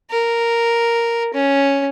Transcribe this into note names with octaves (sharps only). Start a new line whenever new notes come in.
A#4
C#4